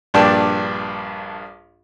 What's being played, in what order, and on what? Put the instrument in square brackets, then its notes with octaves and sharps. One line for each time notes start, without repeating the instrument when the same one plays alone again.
[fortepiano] A#1 G2 D4 G5 A5